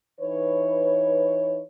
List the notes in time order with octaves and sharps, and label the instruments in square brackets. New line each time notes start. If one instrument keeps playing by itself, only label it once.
[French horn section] E3 D#4 B4 C#5